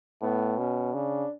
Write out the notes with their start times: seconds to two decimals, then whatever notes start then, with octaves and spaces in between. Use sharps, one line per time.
0.22 A2 B3
0.58 B2 C#4
0.94 C#3 D4